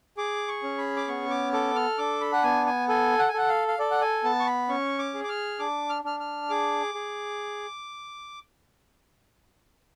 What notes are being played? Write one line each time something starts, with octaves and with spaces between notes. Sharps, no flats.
G#4 D6
C#6
C#4
B5
D6
B3 C#6
D6
A4 D6
F6
D4 D6
B5
F#5
B3 G#5
G#5
A4 G#5
F#5
G#5
A4 F#5
F5
F5
A4 D5
F#5
G#5
B3 A5
C#6
B5
C#4 C#6
D6
G#4
D6
F6
D4 D6
F6
D4 F6
F6
G#4 D6
G#4